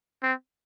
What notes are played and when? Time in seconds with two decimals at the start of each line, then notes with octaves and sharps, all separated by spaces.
0.23 C4